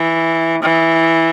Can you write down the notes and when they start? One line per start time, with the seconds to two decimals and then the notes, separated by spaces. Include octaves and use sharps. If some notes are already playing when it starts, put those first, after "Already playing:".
Already playing: E3
0.63 E3